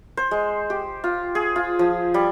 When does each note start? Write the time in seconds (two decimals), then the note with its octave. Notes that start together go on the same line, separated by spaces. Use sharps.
0.17 C5
0.31 G#3
0.70 G4
1.04 F4
1.35 G#4
1.56 F4
1.79 F3
2.14 G3